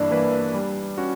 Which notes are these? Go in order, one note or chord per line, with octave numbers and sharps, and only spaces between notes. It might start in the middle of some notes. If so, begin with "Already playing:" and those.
Already playing: G2 E3 A#3 D4 E4 B4
E3 A#3 E4 B4
G3
C#4 F#4